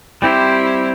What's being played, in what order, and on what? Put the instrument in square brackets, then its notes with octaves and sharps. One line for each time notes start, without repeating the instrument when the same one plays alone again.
[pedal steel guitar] G3 C4 G4 C5 [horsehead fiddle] E4